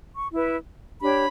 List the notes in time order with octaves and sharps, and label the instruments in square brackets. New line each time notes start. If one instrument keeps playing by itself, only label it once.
[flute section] C#6
E4 B4
D4 G4 C#5 B5